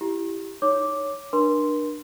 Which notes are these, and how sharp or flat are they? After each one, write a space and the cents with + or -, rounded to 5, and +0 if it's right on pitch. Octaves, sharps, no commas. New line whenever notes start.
E4 +20 G4 +0
D#4 -15 C#5 +5 D6 +0
D4 +25 A#4 +40 C6 -5